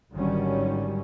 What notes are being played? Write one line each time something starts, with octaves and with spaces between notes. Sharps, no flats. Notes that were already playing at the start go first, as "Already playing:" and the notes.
G#1 D3 D#3 F#3 G3 C#4